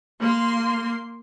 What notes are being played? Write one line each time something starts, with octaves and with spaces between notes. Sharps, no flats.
A#3 C6